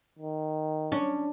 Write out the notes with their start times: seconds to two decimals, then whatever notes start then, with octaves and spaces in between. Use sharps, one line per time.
0.19 D#3
0.92 C#4 D4